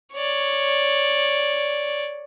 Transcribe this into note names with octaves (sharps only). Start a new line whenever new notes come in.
C#5 D5